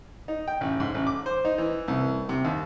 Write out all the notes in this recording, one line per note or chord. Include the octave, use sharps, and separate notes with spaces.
D#4
G5
A1
G#2
A1
D6
C5
D#4
E3
C2
C3
D#2